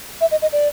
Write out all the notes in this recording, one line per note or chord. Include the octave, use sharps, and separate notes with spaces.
E5
D#5
D#5
D5